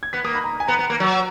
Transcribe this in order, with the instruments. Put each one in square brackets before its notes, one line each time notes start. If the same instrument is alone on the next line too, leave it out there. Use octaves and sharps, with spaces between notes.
[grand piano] G#6
[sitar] B3 [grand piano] B6
[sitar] A#3 [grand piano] D#6
[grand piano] B5
A#5
G#5
[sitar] B3 [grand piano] A#5
[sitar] B3
A#3
F#3